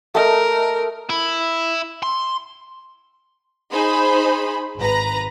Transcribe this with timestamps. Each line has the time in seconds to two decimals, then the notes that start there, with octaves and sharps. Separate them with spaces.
0.15 A3 A#4 D#5
1.10 E4
2.03 C6
3.72 D#4 G#4 C5 B5
4.78 G#1 B4 A#5